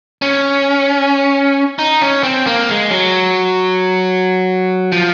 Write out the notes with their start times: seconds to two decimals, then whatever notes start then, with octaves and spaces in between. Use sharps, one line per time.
0.22 C#4
1.79 D#4
2.01 C#4
2.23 C4
2.47 A#3
2.69 G#3
2.91 F#3
4.92 F3